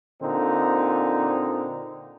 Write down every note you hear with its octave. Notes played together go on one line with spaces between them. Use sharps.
A#2 D3 C4 D#4